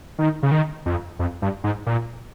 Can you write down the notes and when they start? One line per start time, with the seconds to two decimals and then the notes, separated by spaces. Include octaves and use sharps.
0.19 D#3
0.43 C#3
0.51 D#3
0.86 F2
1.19 F2
1.42 G2
1.64 G#2
1.87 A#2